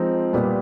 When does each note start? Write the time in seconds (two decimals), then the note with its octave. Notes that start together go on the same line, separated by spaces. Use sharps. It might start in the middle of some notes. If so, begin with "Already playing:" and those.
Already playing: F3 G#3 C4 D#4
0.33 A#2 G3 B3